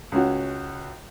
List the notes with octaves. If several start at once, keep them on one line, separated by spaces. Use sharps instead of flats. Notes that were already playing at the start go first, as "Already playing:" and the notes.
C#2 C#4 F#4